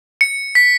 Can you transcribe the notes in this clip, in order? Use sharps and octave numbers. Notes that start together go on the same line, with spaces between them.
C#7
B6